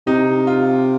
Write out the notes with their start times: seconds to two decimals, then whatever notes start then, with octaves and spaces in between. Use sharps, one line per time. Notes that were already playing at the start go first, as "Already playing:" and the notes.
0.07 C3 D#4
0.47 F4